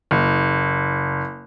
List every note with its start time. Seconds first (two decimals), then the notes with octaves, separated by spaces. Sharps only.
0.11 F#1